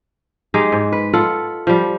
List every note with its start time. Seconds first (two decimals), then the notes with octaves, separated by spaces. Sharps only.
0.54 G#3 D#4 G4
0.72 G#2
0.92 B4
1.13 F4 A4 F#5
1.67 F3 G3